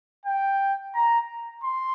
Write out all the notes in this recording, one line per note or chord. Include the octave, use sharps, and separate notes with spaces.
G5
A#5
C6